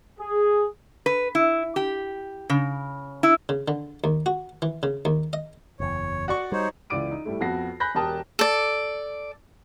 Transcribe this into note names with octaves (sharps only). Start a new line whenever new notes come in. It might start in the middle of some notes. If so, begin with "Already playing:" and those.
G#4
B4
E4
G4
C#3
E4
C#3
D3
D#2
F#4
E3
C#3
D#2
D#5
F#1 E2 C#5
F#4 D5 C#6
G3 D#4 C5 C#5
C#2 E3 D5 D6 D7 D#7
D#4
A2 G3 A3
F2 B3 F#4 A#6 C7
G#5 B5 F#6 G6 A#6
E1 G4 A#4 G5 A5 D#6
A4 D5